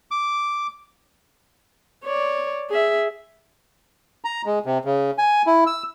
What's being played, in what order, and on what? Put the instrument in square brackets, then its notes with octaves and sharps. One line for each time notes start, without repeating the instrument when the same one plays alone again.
[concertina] D6
[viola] C#5 D5
G#4 E5
[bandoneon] A#5
G#3
C3
C#3
G#5
E4
E6